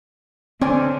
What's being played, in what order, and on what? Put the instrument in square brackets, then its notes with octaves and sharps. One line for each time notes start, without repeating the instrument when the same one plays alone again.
[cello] D3 [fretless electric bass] C4 [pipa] C#4 D5 G#5